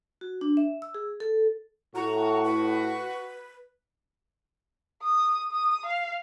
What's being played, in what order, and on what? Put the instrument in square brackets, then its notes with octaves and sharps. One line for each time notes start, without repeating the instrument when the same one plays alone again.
[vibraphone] F#4
D4
E5
E6
G#4
A4
[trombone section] A2 [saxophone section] F#4 [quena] A#5
[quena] B4
[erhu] D#6
D#6
F5